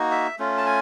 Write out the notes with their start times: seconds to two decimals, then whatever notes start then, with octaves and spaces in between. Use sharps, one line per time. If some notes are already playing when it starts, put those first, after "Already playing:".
Already playing: A#3 D#4 F#4
0.11 E5
0.39 A3 C#4 F4
0.57 A5
0.66 G#5